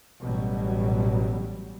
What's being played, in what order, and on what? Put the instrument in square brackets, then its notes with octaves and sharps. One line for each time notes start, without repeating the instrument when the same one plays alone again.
[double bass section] A1 B2 F#3 G3